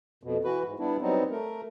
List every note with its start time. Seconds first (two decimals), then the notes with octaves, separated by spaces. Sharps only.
0.23 F2 B2
0.44 E3 F#4 B4
0.65 G#2
0.80 G3 B3 D4 E4
1.01 F#3 G3 B3 C4 D#4
1.30 A3 A#4